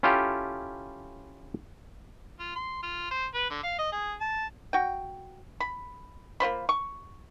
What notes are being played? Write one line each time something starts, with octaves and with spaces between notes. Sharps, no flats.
C#4 E4 F4 G4 A4
F4
C6
F4
C5
B4
D3
F5
D#5
G#4
A5
F#4 G5
B5
A#3 F4 C5 B5
C#6